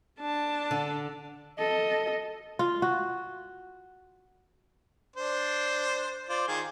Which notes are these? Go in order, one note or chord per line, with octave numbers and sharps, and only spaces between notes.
D4 A5
D3
A4 D#5
F4
F#4
D4 C5
F4 C5 D5
D#3 F4 G#4